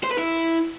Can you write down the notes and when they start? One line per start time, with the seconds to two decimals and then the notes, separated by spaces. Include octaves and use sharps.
0.04 C5
0.11 B4
0.18 E4